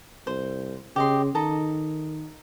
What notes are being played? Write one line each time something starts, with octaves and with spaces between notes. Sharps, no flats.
C2 C5
C#3 G4 D#5 C6
D#3 A4 D#5 A#5